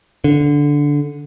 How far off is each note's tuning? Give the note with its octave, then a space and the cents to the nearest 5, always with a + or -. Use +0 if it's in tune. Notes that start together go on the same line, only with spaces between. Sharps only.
D3 -10